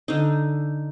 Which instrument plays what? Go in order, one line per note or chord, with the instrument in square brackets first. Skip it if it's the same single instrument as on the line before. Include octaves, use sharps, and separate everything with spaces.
[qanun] D3 D#4